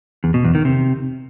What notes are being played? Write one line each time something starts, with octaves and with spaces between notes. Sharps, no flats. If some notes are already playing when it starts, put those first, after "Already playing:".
E2
B2
E2
D#3
C3